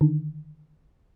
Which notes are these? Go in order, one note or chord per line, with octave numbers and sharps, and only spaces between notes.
D3 D#3